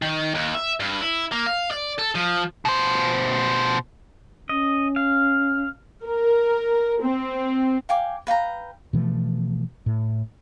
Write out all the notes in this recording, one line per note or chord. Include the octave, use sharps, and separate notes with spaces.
D#3
D#2
E5
G2
E4
A#3
F5
D5
A4
F3
B2 C5
C#4 D#5
F5
A#4
C4
F5 G5 G#5 D6
B4 F5 G5 A#5
B2 E3 F3 A3
A2